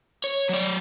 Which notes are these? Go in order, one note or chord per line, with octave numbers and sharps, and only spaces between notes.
C#5
F#3 D5